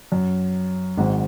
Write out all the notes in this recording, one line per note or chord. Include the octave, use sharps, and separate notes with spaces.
F#2
G#1 G#2